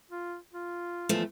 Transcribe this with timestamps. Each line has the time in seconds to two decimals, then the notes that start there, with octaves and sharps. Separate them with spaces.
0.11 F4
0.53 F4
1.09 E2 F3 A3